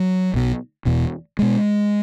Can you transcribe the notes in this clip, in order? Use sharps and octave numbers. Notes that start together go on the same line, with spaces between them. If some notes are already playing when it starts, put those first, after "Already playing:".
Already playing: F#3
B1 B2
E1 E2 B2
B2 G#3